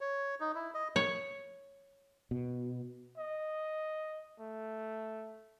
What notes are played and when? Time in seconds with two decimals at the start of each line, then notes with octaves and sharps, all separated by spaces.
0.01 C#5
0.40 D#4
0.55 E4
0.74 D#5
0.96 C#5
2.31 B2
3.18 D#5
4.40 A3